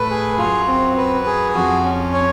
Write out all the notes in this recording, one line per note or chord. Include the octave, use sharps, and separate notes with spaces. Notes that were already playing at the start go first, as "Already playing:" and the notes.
Already playing: A2 B4
G#4
F#2 F4
C4
B4
G#4
F2 F#4
C#4
C#5